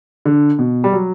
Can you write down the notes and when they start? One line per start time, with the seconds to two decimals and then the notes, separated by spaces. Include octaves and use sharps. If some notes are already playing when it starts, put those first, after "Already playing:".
0.25 D3
0.59 B2
0.84 G3
0.93 F#3